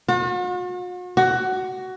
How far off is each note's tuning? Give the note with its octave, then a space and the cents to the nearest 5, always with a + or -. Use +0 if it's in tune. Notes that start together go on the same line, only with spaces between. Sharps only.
F#4 -45
F#4 +15